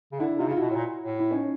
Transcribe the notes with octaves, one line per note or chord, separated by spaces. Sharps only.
C#3
D3 D4 E4
C3 D#4 F4
C#3
F4
B2 E4 F#4
A2
A#2
A2
E4
C#4 D#4